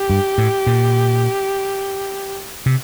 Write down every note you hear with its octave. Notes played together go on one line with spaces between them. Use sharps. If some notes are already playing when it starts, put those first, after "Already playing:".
Already playing: G4
G2
A2
A#2
C3